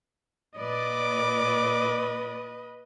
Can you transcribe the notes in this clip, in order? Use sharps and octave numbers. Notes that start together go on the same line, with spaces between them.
A#2 B4 D5 D#5 D6